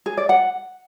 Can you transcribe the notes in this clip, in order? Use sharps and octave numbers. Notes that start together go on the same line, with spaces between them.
G#4
D5
F#5